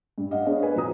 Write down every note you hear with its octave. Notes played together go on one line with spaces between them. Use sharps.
G2
D#5 F5 F#5
B3 D4 G#4 C#5
B4 G#5
F2 F#3 A#5 D#6